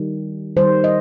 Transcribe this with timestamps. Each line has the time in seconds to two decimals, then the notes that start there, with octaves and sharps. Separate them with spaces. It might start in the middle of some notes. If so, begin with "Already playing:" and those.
Already playing: D#3 G3
0.57 D#3 G3 C5
0.84 D#5